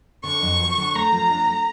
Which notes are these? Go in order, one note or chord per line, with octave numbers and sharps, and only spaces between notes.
D3 C#6
F2
F3
D3
A3 A#5
F3
D4
A3